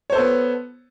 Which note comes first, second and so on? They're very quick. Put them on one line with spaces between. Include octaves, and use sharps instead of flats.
C#5 C5 A4 B3